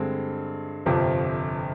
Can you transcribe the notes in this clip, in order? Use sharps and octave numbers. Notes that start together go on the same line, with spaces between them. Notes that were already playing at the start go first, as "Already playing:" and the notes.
Already playing: G2 D3 G#3 C4
G1 F2 C3 F3